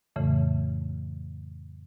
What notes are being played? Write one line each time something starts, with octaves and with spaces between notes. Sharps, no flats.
F2 A2 C#3 E3 A3